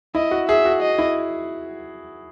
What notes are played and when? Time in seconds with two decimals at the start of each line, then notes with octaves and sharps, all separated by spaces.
0.15 E4 D#5
0.31 F#4
0.48 G#4 E5
0.65 F#4
0.82 D#5
0.98 E4